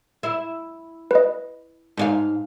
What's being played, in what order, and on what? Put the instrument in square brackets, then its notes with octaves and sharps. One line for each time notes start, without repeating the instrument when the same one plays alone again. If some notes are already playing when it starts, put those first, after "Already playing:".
[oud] E4
[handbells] B4 D#5
[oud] G#2 D5 F5